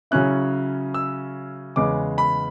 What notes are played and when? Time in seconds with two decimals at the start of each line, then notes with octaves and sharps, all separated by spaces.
0.11 C#3 F#3 C#4 E4 F#6
0.94 E6
1.76 E2 C#3 G#3 B3 D6
2.18 B5